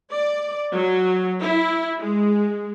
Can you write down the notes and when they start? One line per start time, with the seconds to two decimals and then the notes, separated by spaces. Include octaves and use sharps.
0.13 D5
0.74 F#3
1.41 E4
1.99 G#3